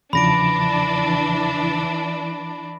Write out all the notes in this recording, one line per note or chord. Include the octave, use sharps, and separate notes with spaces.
E2 C#3 E3 F3 D4 B5 A#6 D7